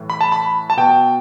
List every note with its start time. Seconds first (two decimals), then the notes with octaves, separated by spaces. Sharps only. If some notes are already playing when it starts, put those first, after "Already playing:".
Already playing: A2 E3
0.10 B5
0.21 A5
0.32 B5
0.70 A5
0.77 B2 G5